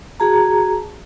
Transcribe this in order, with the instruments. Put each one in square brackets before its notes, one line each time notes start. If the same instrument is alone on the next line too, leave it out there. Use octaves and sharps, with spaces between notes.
[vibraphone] F#4 G#4 A5 A#5